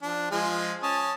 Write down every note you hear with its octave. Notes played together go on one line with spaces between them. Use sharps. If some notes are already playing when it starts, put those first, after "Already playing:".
F3 D4
F3 G#3 G#4
C#4 A5 D#6